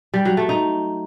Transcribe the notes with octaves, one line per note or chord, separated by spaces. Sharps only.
G3
F#3
A3
D#4